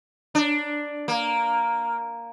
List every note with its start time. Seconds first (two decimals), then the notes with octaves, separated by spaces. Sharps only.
0.35 D4
1.08 A#3